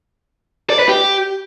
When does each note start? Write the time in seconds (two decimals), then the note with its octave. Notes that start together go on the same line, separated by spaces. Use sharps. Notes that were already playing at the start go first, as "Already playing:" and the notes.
0.70 D5
0.79 B4
0.88 G4